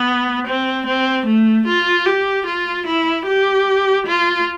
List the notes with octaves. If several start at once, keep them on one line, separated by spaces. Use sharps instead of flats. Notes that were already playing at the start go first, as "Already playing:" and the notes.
Already playing: B3
C4
C4
A3
F4
G4
F4
E4
G4
F4